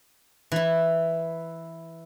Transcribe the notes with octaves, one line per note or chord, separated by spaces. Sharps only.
E3 E4